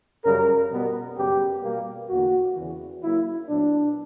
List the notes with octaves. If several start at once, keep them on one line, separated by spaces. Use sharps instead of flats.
F#2 C#3 G3 A#4
B2 G3 B3
F#2 C#3 G3 B3 G4
B2 G3 A#3
E2 D3 A#3 F#4
E2 C#3 E3
C#3 F#3 A#3 E4
A#2 F#3 B3 D4